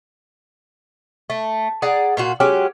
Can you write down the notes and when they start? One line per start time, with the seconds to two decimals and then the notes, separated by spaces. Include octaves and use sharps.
1.30 A3
1.82 G#4 D5 F#5 A#5
2.17 A#2 F4 F#4
2.40 F#3 G#3 C#4 G4